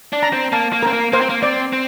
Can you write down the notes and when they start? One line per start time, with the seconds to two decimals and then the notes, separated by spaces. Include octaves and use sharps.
0.13 D4
0.23 A#5
0.33 C4
0.52 A#3 A5
0.73 A#3
0.83 C4 A#4
0.93 A#3
1.13 A#3 C5
1.21 C4
1.30 A#3
1.43 C4 D5
1.73 C4